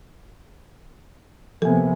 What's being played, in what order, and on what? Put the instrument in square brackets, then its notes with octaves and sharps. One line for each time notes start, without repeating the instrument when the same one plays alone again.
[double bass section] C3 A#3 B3 [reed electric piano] F3 G#5 [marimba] A4